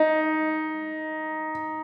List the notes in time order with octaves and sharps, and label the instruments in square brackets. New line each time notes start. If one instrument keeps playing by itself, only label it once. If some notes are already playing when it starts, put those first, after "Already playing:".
Already playing: [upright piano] D#4